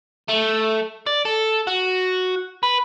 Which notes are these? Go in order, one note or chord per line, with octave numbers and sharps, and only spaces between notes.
A3
D5
A4
F#4
B4